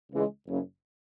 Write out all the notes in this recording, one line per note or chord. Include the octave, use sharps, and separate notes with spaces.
C#2 C#3 E3 G#3
F#1 F#2 C#3